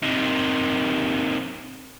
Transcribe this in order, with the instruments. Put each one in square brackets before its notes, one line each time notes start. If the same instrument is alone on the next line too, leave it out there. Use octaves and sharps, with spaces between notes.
[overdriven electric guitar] C3 D#3